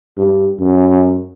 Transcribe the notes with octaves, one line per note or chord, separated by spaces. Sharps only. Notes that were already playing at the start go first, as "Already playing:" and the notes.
G2
F#2